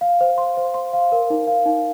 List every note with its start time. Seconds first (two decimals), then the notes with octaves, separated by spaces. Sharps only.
0.01 F5
0.21 C5
0.38 C6
0.57 C5
0.74 C6
0.93 F5
1.12 A#4
1.30 D#4
1.47 F5
1.66 D#4